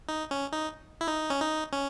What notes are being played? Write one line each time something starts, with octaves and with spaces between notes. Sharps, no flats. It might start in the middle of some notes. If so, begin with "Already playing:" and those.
D#4
C#4
D#4
E4
D#4
C#4
D#4
C#4